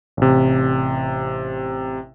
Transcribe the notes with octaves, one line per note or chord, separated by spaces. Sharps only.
A1 C3